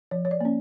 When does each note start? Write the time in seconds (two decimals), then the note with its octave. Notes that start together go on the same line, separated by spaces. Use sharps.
0.11 F3 C#5
0.25 C#5
0.31 D5
0.41 A#3 C#4